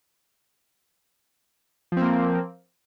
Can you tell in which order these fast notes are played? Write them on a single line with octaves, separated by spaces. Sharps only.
F3 C4 A#3